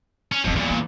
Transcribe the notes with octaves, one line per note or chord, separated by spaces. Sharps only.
C#4
D1 G1 F2
E2 A#2 C4
A#3